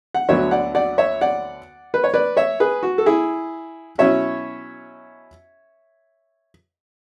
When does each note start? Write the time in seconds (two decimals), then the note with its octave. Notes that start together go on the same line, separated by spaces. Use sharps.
0.15 F#5
0.29 D2 D3 F#3 B3 C#5 E5
0.51 D5 F#5
0.75 D5 F#5
0.98 C#5 E5
1.21 D5 F#5
1.94 B4
2.04 C#5
2.14 B4 D5
2.37 C#5 E5
2.60 G#4 B4
2.83 F#4
2.98 A4
3.06 E4 G#4
3.98 B2 F#3 C#4 E4 C#5 E5